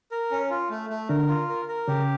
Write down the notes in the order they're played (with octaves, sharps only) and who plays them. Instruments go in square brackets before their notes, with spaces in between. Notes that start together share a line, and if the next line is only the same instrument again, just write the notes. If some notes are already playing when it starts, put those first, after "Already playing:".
[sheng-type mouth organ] A#4
C#4
F4
A3
A3
[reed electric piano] D3 D4 [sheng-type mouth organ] A#4
[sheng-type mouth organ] F4
A#4
A#4
[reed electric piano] C#3 C#4 [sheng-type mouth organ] G4